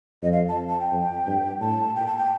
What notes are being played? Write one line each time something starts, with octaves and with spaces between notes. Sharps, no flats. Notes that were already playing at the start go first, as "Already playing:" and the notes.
F2 D#5
F5
A5
A5
G5
F2
G2
A2 A5
A#2 G5
A5
G5